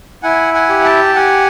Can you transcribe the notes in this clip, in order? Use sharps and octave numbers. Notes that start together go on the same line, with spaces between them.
E4 F#5 G#5
F#5 G#5
G4
G5 A5
G4 F#5 G#5